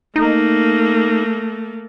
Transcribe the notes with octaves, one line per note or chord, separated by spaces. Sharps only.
A3 A#3 D#4